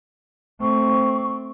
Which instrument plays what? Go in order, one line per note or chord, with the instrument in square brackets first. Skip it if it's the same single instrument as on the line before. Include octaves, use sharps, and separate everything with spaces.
[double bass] A3 C4 [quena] C#6